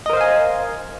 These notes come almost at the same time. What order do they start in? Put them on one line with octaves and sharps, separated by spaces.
D#5 A#4 C5 F5 G#5